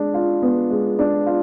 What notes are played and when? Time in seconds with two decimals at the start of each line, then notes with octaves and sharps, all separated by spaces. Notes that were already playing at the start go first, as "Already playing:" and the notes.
Already playing: G#3 D4
0.14 F4
0.42 B3
0.71 G#3
0.99 D4
1.26 F4